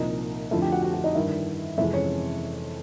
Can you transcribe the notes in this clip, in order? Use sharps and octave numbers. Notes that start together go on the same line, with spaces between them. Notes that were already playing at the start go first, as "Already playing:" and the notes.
Already playing: C2 A#2 F3 D#4 D#5
F2 D3 F3 A3 E4 E5
G4 G5
F#4 F#5
F#4 F#5
F#4 F#5
D#4 D#5
G2 D#3 G3 E4 E5
F2 C3 E3 G#3 E4 E5
C#4 C#5